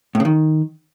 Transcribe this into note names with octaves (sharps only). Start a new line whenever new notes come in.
A2
C#3
D#3